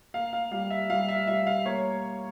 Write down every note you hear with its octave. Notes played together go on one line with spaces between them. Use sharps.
A#3 F5
F5
G3 F5
E5
G3 F5
E5
G3 E5
F5
A#3 C#5